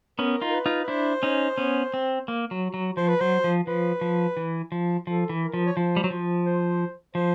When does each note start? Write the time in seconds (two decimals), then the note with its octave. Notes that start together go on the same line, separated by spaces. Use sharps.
0.19 B3 C#4 A#4
0.41 D#4 F4
0.50 A#4
0.54 B4
0.66 D#4 F4
0.83 B4
0.88 D4 E4 C5
1.23 C#4 D#4
1.58 B3 C#4
1.94 C4
2.28 A#3
2.51 F#3
2.74 F#3
2.97 F3 C5
3.08 B4
3.20 F#3 C5
3.44 F3
3.67 F3 B4
4.01 F3
4.37 E3
4.72 F3
5.07 F3 A4
5.29 E3
5.41 A#4
5.54 F3
5.66 C#5
5.76 F3 C5
5.97 G3
6.04 F#3
6.10 F3
6.46 C5
7.15 F3 C5